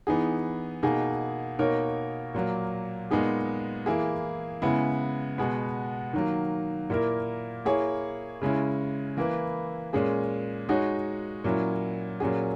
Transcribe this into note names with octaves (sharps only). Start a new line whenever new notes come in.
E3 B3 D#4 G#4
B2 A#3 D#4 G#4
B2 A#3 D#4 A#4 C#5
A#2 F#3 A#3
A#2 G#3 B3 D#4 G#4
E3 A#3 E4 G#4
C#3 G#3 B3 E4
B2 G#3 B3
D#3 F#3 A#3
A#2 A#3 E4 A#4
A#3 E4 G#4 C#5
C#3 G#3 C#4 E4
E3 A#3 E4 B4
A#2 G#3 C#4 G#4
G#3 D#4 F#4 C#5
A#2 F#3 C#4 E4
A#2 F#3 C#4 G#4